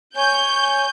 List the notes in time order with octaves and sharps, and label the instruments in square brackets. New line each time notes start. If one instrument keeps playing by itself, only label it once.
[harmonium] C#5 G#5 [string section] G6